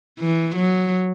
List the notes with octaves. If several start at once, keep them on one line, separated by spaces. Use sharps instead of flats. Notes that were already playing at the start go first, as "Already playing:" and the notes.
E3
F#3